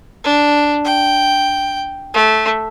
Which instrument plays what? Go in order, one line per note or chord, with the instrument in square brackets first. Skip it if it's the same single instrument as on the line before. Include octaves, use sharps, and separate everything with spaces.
[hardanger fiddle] D4
G5
A3